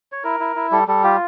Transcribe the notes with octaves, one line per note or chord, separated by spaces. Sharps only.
C#5
E4 A#4
E4
E4
G3 A4
G3 A4
F4 G4